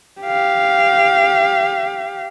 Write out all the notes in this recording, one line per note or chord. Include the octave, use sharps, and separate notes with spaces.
G4 F5